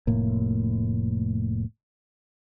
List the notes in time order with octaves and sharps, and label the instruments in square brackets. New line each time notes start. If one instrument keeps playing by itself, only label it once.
[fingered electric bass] F1 A2 A#3